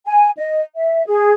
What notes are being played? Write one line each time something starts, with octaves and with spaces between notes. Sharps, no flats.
G#5
D#5
E5
G#4